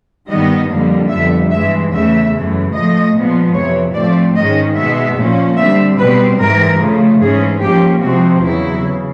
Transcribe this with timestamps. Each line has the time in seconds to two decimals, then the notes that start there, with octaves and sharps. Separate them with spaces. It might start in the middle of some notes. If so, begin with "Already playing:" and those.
0.28 G2 D#3 G3 B3 D#5
0.69 F2 D3 G3 A#3
1.09 F2 D3 G3 B3 E5
1.51 G2 E3 G#3 E5
1.91 E2 C#3 E3 A3 E5
2.32 F#2 C#3 E3 A3
2.72 A2 F3 A3 D#5
3.13 A#2 F3 G#3 B3
3.53 F2 C3 E3 C#5
3.94 A2 F3 A3 C4 D5
4.36 G#2 D#3 G#3 C#4 D#5
4.76 B2 G#3 B3 E5
5.16 A#2 F3 A#3 C#4
5.57 D3 G3 C4 E5
5.98 B2 G3 C4 B4
6.38 G#2 E3 G3 A#4
6.79 C#3 F3 A3
7.20 G#2 E3 A3 C#4 G#4
7.60 G#2 F3 A#3 C#4 G4
8.01 C3 F3 G#3 C4 F#4
8.42 E2 C#3 F#3 E4
8.83 C#3